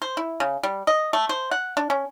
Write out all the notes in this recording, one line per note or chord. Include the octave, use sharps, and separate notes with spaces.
C5
E4
C#3
G3
D#5
A3
C5
F#5
D4
C#4